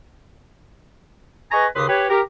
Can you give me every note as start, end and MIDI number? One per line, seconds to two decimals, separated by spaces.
1.52 1.67 68
1.52 1.67 71
1.52 1.67 75
1.52 1.67 80
1.52 1.67 82
1.52 1.67 85
1.75 1.88 39
1.75 1.88 49
1.75 1.88 67
1.75 1.88 71
1.75 1.88 84
1.75 1.88 87
1.89 2.09 67
1.89 2.09 71
1.89 2.09 73
2.10 2.21 67
2.10 2.21 70